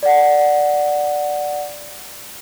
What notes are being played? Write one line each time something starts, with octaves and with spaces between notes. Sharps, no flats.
D5 F#5